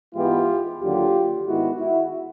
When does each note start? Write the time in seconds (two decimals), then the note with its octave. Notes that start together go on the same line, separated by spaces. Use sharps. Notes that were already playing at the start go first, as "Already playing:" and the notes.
0.15 G#2 E3 G#3 B3 F4 G4
0.80 D#2 D3 F#3 A#3 F4 G4
1.47 G#2 D#3 G#3 B3 E4 F#4
1.80 E4 F#4